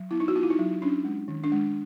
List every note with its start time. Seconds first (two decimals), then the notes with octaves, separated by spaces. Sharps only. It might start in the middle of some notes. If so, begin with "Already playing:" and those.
Already playing: F#3
0.11 B3 E4
0.20 D#4
0.28 F#4
0.36 B3 F4
0.43 E4
0.50 D#4
0.59 F#3
0.82 C#4 D4
1.05 G#3
1.28 D#3
1.44 D4
1.52 G#3